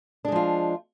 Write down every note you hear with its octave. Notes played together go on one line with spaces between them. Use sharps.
F3 G#3 D4 F4